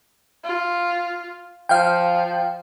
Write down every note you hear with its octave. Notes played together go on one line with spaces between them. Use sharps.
F4
F3 F5 G5